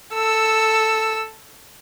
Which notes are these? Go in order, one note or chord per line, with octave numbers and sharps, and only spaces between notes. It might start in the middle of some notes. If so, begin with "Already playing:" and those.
A4 E6